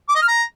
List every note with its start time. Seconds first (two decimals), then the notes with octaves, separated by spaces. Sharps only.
0.09 D6
0.15 D#5
0.22 F6
0.28 A#5